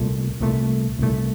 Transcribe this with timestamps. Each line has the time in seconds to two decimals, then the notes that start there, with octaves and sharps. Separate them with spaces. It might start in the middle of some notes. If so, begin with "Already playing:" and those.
Already playing: C2 A#2 A3
0.41 C2 A#2 A3
0.99 C2 A#2 A3